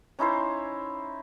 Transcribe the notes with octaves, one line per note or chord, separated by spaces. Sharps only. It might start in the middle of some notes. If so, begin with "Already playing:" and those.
C#4 D#4 E4 C5